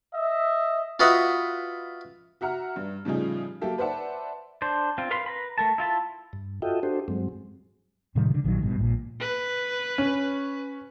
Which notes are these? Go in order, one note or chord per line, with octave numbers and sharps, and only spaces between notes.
D#5 E5
F4 F#4 B4 D#5 E5 F#5
F#4 E5 F#5 A#5 F6
G2
A2 C#3 F3 G3 D#4 G#4
F#3 A#3 G4 A4 E5
B4 C5 D5 E5 F#5 A5
D4 C5
C4 F4
A#4 B4 F5 B5 C6
B4 A#5 B5
A3 A#4 A5
E4 F4 A5 B5
G2
F4 F#4 A4 D#5 E5 G5
D4 F#4 G4 A4 C5
G2 F#3 G#3 C4
A2 C3 D#3 G3
D3 F3
A#1 D#3 E3 F#3
G1 G2 B2
A#1 A#2
B4
C#4